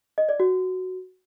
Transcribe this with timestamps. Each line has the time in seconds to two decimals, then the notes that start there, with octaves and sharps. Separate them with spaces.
0.18 D#5
0.29 D5
0.40 F#4